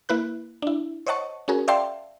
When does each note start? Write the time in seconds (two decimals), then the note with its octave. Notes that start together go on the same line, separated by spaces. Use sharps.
0.09 A#3 E4 B4 F#6
0.62 D4 E4
1.07 C5 C#5 D#5 F#5 A5 C#6
1.48 C#4 F#4 G#4 A#4
1.68 D5 E5 F5 G5 A5 C6